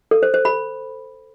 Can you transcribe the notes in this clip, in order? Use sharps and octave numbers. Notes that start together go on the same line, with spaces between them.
A4
C5
C5
B5